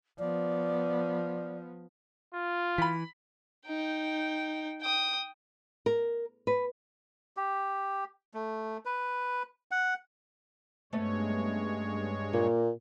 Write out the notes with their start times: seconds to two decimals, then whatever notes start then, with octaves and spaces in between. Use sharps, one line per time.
0.19 F3 B3 D5
2.34 F4
2.78 E3 B5 B6
3.67 D#4 G5
4.81 G5 D#6
5.86 A#4
6.47 B4
7.37 G4
8.34 A3
8.85 B4
9.71 F#5
10.93 G2 G#3 A3 B3 C#4 C#5
12.33 A#2 A#3